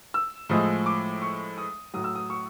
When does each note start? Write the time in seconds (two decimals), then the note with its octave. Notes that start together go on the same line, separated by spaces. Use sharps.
0.14 E6
0.49 A2 F3 G#3 D#6
0.86 D6
1.22 C#6
1.58 D#6
1.94 A2 F#3 D#6
2.04 E6
2.16 D#6
2.30 C#6